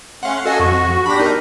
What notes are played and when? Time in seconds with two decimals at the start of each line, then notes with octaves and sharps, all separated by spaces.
0.23 A3 C#4 F5 F#5 C6
0.46 F#4 A4 D#5 G#5
0.60 F2 C#6
1.06 E2 D4 G4 B5 A#6
1.20 D#4 A#4